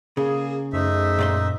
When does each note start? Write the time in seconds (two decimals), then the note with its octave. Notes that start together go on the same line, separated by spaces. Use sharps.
0.17 C#3 A#3 G#4
0.73 F#2 A3 D#4 G#4 C5 E5
1.19 A#2 D5 C6